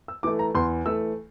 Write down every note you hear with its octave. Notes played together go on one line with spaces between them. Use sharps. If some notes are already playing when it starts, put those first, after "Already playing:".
E6
E3 A3 D6
A#5
E2 C6
E3 A3 E6